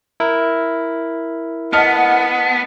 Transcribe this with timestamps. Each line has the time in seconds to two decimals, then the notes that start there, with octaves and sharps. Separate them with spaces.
0.20 E4 A#4
1.73 B3 D#5 F#5 A5 F6